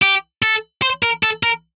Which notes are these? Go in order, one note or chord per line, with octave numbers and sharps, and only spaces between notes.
G4
A4
C5
A#4
A4
A#4